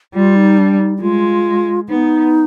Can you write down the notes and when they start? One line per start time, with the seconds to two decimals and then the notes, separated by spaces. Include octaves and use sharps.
0.14 G3 F4
0.36 D#4
0.58 D4
0.79 D#4
0.98 D#4
1.01 G#3 F4
1.89 B3 D#4